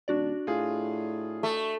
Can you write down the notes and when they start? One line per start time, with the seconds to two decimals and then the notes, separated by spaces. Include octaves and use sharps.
0.08 D#1 D4 F#4 D5
0.47 A2 F4 G#4
1.43 A3